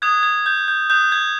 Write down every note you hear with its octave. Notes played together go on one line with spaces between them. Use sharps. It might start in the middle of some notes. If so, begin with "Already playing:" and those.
D#6 F#6 G#6
G#6
G6
G6
D#6 F#6 G6
G#6